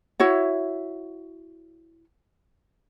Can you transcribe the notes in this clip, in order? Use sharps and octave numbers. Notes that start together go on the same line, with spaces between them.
E4 F#4 C#5